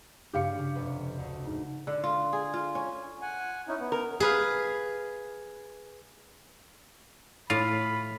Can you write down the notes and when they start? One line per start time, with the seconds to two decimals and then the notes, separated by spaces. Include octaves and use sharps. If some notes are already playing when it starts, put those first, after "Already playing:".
0.33 G2 C#3 G4 F5 C#7
0.59 C#3
0.75 F1 B4
1.18 D2
1.45 G#2
1.87 D3
2.04 F4
2.33 G#4
2.54 F4
2.75 C#4
3.22 F#5 G#5
3.68 C#4 D#4 E4
3.80 B3
3.92 A#4
4.20 G#4 B4 F5
7.50 A2 F4 B5